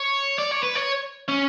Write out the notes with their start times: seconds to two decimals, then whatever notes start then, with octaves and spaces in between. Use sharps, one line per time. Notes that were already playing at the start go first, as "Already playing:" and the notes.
Already playing: C#5
0.39 D5
0.52 C#5
0.63 B4
0.75 C#5
1.28 C#4